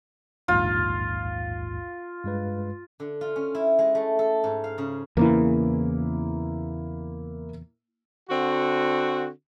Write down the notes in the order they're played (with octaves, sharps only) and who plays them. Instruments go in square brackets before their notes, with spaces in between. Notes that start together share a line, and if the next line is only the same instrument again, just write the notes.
[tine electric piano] A#1 D#2 G#2 [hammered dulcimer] F4
[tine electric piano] G2 G#3 B4
[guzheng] D3
F4
C#4
E4
G#3
A3
A4
G#2
F5
C#3
[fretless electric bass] E2 C#3 E3 [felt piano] A#3 E4
[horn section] D3 C4 F#4